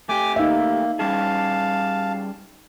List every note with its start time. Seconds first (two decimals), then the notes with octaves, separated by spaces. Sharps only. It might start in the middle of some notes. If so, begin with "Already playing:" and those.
0.09 A3 G4 G#5 D6
0.36 A#3 D#4 E5
0.99 G3 C#4 G#4 F5 A5